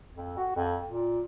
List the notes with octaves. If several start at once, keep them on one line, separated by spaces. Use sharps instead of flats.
F2
F#4
F2
A#2